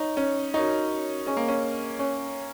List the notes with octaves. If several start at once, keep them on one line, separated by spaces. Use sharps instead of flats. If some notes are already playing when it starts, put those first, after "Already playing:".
Already playing: D#4 C#5 A#5 C#6
C#4
D#4 F#4 A#4 C#5 A#5 C#6
C#4 G#4 D#5 G#5 C#6
A#3
C#4
C#4 C#5 G#5 C#6